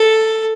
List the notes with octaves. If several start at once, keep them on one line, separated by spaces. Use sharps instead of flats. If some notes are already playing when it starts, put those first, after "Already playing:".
Already playing: A4